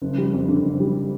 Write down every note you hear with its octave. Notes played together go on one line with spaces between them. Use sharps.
F#1
G3
F2
D3
F#1
G3